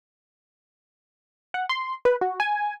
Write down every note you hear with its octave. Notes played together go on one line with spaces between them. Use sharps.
F#5
C6
B4
F#4
G#5